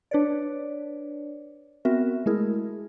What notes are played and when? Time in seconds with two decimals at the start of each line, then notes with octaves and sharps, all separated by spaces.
0.11 D4 B4 C#5 D5
1.85 B3 C4 F#4 A#4 E5
2.26 G#3 A3 E4 G#4 A#4